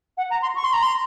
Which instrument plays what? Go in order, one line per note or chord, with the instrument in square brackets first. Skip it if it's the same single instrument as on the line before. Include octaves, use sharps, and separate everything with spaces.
[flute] F#5
A#5
C6
C#6
C6
A#5
C6